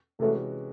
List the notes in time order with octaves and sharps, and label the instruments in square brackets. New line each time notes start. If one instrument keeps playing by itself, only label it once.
[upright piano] C3 E3 G#3 C#4 F#4 [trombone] A3